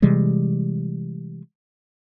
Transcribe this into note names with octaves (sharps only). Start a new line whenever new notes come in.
C3 E3 G3 G#3